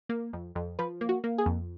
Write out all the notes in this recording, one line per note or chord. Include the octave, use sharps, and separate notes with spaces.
A#3
F2
F2
F3 B4
A#3
F#4
A#3
G#4
F2